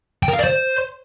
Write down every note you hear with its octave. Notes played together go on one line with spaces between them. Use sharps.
G5
A#4
F5
D5
C5